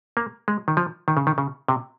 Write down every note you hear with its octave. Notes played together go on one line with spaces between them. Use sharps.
A#3
G#3
D#3
F3
D#3
C#3
D#3
C#3
C3